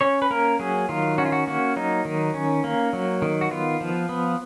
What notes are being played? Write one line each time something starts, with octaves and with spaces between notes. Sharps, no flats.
C#4 C#5
B4
A#3 A#4
F#3 G#4
D#3 F4
C#4 F#4
F4
F#4
A#3 F#4
F#3 D#4
D#3
C#4
A#3
F#3
D#3
F#4
B3 F4
F3
B3